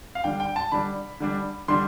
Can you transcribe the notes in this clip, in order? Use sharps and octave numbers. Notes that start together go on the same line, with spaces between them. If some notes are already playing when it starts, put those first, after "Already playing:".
F5
D3 G3 D4 G5
G5
A5
D3 G3 D4 B5
D3 G3 D4
D3 G3 D4 C6